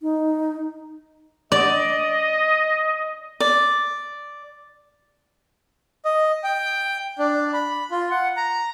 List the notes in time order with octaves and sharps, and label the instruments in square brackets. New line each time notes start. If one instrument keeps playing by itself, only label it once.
[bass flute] D#4
[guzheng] D5 [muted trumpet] D#5
[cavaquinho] D5
[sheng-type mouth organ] D#5
G5
D4
B5
F4
F#5
A#5